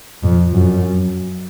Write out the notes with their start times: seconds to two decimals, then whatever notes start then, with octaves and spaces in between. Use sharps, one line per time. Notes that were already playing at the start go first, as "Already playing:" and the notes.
0.23 F2
0.53 F#2